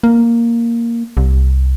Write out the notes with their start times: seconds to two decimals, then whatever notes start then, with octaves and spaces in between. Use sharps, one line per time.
0.03 A#3
1.17 C2